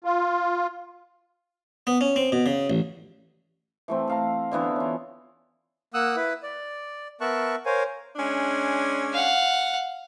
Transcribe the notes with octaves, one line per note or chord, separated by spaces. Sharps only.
F4
B3
C#4
C4
B2
C#3
A1
E3 A3 C4
A4 F5 A#5
D3 E3 B3 E5
C#4 F4
A#3 F#5 D#6 E6 F#6
E4 B4
D5
B3 A#4 E5 A5 C#6 F#6
A#4 C5 C#5 F5 G#5
G#3 C#4 D4
F5 F#5